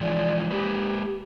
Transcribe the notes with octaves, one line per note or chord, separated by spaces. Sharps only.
E3 F3 G#3 D5
G#3 A#3 G4 B4